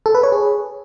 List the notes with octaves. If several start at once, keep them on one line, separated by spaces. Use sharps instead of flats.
A4
B4
C#5
G#4